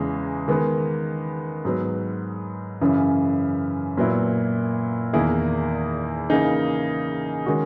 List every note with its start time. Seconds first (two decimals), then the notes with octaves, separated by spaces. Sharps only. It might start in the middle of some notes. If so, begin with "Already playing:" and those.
Already playing: E2 C#3 E3 G#3
0.48 D#3 G#3 B3
1.65 G#2 F#3 B3
2.81 F#2 C#3 E3
3.97 A#2 F#3 B3 E4
5.13 E2 D#3 A#3 E4 G#4
6.30 C#3 E3 A#3 D#4 G#4
7.46 D#3 G#3 C#4 F#4